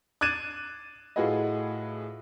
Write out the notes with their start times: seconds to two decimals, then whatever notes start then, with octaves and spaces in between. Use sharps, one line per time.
0.21 D6 F#6 G#6 A6 D#7 E7
1.16 A2 F4 F#4 G#4 B4 D#5